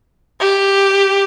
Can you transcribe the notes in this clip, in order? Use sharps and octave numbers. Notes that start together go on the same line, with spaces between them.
G4